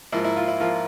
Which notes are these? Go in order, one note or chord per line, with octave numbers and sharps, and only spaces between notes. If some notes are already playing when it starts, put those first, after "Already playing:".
G#2 F3 A#3 E4
E4
F4
E4
F3 A#3 F4